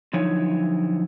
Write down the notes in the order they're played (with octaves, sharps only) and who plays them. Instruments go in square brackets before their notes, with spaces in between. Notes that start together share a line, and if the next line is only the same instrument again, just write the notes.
[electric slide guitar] D3 F3 F#3 D#4 E4 C#5